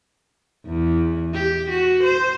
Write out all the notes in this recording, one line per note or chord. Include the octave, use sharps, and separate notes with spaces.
E2
G4
F#4
C5